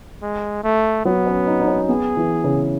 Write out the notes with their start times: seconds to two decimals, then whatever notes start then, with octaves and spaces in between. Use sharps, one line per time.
0.22 G#3
0.64 A3
1.05 F#3 B3
1.27 C#4
1.47 D#4
1.61 D#4
1.68 C#4
1.89 B3 G#4
2.17 E3
2.44 C#3